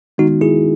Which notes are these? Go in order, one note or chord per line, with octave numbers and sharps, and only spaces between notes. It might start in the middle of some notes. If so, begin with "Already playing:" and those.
D#3 G#3 B3 D#4 F#4
E4 G#4